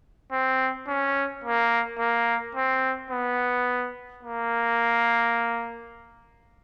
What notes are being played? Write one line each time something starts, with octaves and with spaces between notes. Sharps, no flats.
C4
C#4
A#3
A#3
C4
B3
A#3